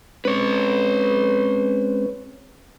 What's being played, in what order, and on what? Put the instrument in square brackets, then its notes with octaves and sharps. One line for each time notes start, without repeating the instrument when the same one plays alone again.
[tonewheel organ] G#3 C4 C#4 [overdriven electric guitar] B4 C#5